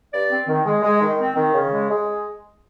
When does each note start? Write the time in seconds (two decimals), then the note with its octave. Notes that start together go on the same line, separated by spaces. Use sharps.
0.12 G2 D5
0.30 C4
0.47 D#3
0.66 G#3
0.83 G#3
1.01 D#3
1.18 C4
1.36 D#3
1.54 C#3
1.73 G#3
1.90 G#3